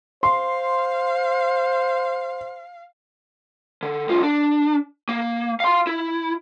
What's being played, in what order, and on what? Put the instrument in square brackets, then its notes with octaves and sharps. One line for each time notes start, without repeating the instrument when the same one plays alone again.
[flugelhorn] C5 [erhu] F5 [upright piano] C6
[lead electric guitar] D3
C2 F4
D4
A#3
F5 C6
E4